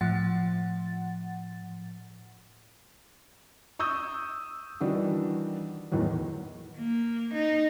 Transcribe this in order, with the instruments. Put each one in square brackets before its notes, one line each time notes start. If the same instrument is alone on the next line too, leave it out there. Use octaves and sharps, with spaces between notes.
[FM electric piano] A2 F3 F#5 A6
[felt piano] C#6 D#6 E6 G6
D#3 E3 G3 D4 F#4
E2 A2 D#3 E3 F#3
[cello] A#3
D#4